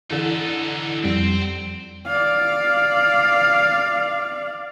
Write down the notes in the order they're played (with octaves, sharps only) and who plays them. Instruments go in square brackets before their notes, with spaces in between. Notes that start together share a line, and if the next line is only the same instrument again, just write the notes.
[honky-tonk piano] D3 E3 [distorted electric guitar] D#4 A4
[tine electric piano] F2 G3 [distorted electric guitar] C4
[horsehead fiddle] D5 F5